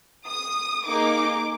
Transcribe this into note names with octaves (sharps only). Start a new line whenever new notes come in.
D#6
A#3 D#4 G#4 D6